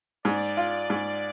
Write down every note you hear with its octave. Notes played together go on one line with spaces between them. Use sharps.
G#2 D5
F4
G#2